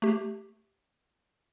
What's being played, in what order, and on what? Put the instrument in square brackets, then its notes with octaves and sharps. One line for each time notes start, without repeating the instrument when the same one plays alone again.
[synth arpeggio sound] A3 G4